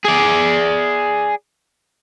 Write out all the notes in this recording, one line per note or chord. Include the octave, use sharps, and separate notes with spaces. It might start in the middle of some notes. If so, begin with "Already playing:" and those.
G#4 D5